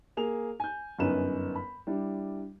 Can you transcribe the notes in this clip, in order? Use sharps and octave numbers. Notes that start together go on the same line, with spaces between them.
A#3 G#4 F7
G#5 G6
G1 F#2 C#4 D#4 B4 E7
B5
G3 D4 E4